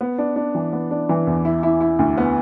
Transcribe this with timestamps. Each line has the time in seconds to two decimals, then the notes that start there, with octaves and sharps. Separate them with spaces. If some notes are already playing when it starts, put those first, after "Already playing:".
0.01 B3
0.18 D4
0.36 D4
0.55 E3
0.73 B3
0.91 D4
1.09 E3
1.27 E2
1.45 E4
1.63 E4
1.81 E4
1.99 D2
2.18 B3